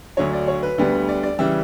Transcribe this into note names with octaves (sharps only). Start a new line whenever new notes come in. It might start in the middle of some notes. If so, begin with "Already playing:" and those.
D2 D3 F#3 C#5
D5
C#5
B4
D2 D3 G3 B3
D5
D5
C#3 E3 G3 E5